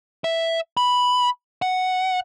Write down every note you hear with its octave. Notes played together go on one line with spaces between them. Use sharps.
E5
B5
F#5